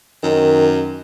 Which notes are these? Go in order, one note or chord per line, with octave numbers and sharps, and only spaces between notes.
F#2 D#3